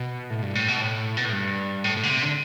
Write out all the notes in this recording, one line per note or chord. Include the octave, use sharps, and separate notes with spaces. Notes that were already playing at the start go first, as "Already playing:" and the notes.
Already playing: B2
A2
G2
A2
B2
A2
B2
A2
G2
A2
A2
D3
C3
D3